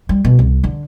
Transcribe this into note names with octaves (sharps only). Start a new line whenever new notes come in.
G3
B2
C2
D3